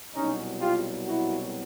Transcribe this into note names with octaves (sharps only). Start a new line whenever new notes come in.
C2 B2 F#3 C#4 D#4
F4 G4
E4 F#4